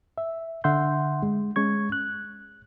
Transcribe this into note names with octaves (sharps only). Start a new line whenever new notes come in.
E5
D3 E5 F#5 C6 G6
G#3
G#3 C#4 C#6 G#6
F#6